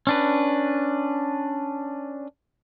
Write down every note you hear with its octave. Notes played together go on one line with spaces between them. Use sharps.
C#4 D4 B4